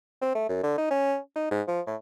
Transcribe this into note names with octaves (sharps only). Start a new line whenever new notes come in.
C4
A3
F#2
D3
D#4
C#4
D#4
G#2
F3
A2